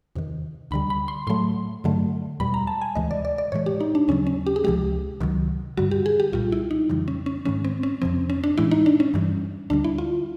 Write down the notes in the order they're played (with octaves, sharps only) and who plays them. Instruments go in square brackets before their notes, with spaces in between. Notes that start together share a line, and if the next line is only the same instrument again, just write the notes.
[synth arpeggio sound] E2 C3 D#3
D2 D3 G3 B5
B5
C6
A2 F#3 A3 C6
G2 D3 F#3 A3
E2 B2 G3 B5
A#5
A5
G#5
D2 C3 E3 G#3 D#5
D5
D5
D5
A2 E3 G#3 C#5
G4
D#4
D4
D#2 C#3 F#3 C#4
C#4
G4
G#4
C#2 C3 F3 G#3 G4
C#2 C3 D#3 F#3
G2 D3 G3 F#4
G4
G#4
G4
C2 A#2 G3 F4
E4
D#4
F2 C#3 E3 G3
C#4
C#4
G#2 D#3 G#3 C#4
C4
C#4
F2 C3 F3 C4
C#4
D4
A2 E3 G#3 E4
D#4
D4
C#4
G2 E3 G3
D2 D3 G3 D4
E4
F4